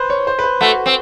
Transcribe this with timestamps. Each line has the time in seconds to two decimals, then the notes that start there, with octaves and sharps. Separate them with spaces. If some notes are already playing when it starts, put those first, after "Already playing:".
Already playing: B4 C5
0.10 C#5
0.27 C5
0.39 B4
0.44 C5
0.61 A3 F#4
0.86 C4